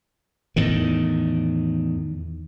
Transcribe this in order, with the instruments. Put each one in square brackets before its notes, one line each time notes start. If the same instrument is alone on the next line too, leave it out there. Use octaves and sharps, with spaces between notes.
[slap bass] E2 A2 D#3